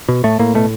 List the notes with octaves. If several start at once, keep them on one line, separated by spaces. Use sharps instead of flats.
B2
A2 A3
A2 A#3
B2 A3